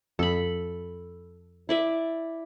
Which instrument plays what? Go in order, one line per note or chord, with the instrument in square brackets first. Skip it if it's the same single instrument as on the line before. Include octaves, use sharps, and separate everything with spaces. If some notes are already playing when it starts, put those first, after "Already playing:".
[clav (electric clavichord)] F2 [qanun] A4 B5
[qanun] E4 D5 E5